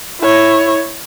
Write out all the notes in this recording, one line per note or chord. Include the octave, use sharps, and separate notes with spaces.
E4 C#5